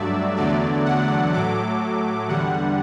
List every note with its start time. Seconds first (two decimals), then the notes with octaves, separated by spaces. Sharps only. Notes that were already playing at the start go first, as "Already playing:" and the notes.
Already playing: G2 F#3 A3 D5 E5
0.36 E2 D3 F#3 A3 D5
0.85 F#5
1.33 A2 F#3 A3 D6
2.28 E2 D3 G3 F#5